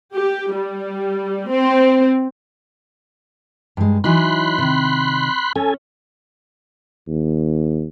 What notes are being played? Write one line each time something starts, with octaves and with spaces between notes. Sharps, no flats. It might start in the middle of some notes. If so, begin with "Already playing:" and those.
G4
G3
C4
G2 G#3
E3 F#3 D#4 B5 C6 F#6
C3 D#3
C#4 A4 G#5
D#2